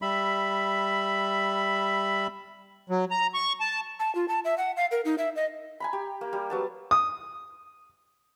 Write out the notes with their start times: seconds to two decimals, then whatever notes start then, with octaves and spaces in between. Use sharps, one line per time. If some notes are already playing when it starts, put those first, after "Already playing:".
0.02 G3 E5 B5
2.90 F#3
3.11 A#5
3.34 C#6
3.60 A5
4.00 A5
4.15 F4
4.28 A5
4.45 E5
4.58 F#5
4.77 F5
4.91 A#4
5.05 D#4
5.18 E5
5.36 D#5
5.80 G#5 A#5 B5
5.93 G4
6.21 A#3
6.33 G3
6.50 F#3 B3 A5
6.91 D#6